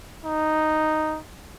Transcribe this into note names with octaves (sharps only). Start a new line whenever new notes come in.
D#4